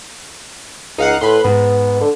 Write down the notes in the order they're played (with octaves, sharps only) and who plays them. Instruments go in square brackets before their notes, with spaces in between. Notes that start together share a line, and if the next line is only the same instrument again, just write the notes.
[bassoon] C#2 [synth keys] D#4 F5 F#5
[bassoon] A2 [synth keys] B4 B5 C6
[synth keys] G#2 [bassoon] B3
[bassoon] D3